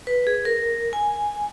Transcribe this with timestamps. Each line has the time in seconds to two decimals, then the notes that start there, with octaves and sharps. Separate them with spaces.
0.07 B4
0.27 G#4
0.45 A#4
0.93 G#5